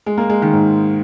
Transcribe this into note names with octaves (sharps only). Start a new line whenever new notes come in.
G#3
A#3
G#3
D#3
G#2